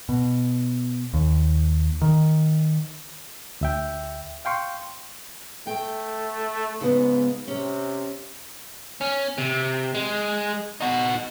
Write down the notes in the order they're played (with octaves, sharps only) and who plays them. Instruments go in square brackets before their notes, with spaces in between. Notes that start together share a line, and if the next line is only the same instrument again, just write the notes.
[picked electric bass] B2
D#2
D#3
[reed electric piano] D2 E5 G5
F5 G5 C6 C#6
[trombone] A3 [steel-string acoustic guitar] G5
[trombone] G#2 [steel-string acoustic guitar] C#3 G#3 B3
[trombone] C3 [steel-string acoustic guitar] C#4
[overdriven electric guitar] C#4
C3
G#3
D#4 F#4